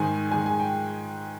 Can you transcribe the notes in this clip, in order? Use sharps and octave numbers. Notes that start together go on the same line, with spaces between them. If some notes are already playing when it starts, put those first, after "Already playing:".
Already playing: G#2 D#3 G#3 G#5
G#2 D#3 G#3 G#5
G#5
G5